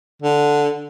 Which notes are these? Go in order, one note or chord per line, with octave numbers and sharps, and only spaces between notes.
D3